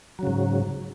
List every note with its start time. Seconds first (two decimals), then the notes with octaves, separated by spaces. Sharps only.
0.19 F#3
0.23 C#3
0.27 G#2